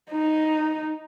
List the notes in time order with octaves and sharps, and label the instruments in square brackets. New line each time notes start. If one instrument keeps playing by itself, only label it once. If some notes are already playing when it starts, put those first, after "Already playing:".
[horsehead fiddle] D#4